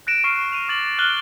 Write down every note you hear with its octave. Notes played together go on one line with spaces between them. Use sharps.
F#6 A#6 D7 E7
C#6 F6 C7 D#7
D#7 F7
D6 A6 F#7
F6 F#6 D7 D#7 F#7 G7